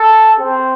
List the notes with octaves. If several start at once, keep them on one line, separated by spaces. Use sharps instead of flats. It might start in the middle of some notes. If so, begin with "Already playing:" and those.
Already playing: A4
C4